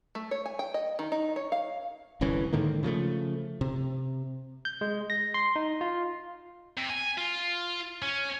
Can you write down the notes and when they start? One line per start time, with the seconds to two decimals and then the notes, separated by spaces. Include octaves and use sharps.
0.15 A3
0.31 C#5
0.46 G#5
0.59 G5
0.74 D#5
0.99 D#3
1.12 D#4
1.36 C#5
1.52 F5
2.21 G1 C2 E3 C#4
2.53 G#2 D3 D#3 A#3
2.83 C#3 F3 G#3 A3
3.61 C3
4.65 G6
4.81 G#3
5.10 A#6
5.34 C6
5.56 D#4
5.81 F4
6.77 C3
6.90 G#5
7.18 F4
8.02 C#4